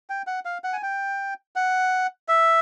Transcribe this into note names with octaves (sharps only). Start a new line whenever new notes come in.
G5
F#5
F5
F#5
G#5
G5
F#5
E5